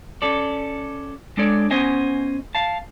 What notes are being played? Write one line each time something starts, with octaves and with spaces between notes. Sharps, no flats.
C#4 A4 D5
G#3 D4 A4 C#5 D5
B3 C#4 C5 D#5 G#5
F5 A5